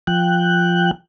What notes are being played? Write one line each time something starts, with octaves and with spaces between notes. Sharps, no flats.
F3 G5 F#6